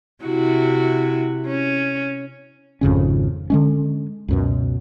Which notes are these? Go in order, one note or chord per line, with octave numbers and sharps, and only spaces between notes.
C3 E4 F#4
C#4
G#1 F2 C#3 C#4
D3 G#3 C#4
C#2 F#2 B2